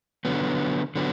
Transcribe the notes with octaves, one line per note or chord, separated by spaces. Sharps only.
D3 F#3 B3
D3 F#3 B3